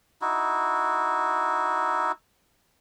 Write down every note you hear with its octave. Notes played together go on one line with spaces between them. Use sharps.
D#4 E4 F#4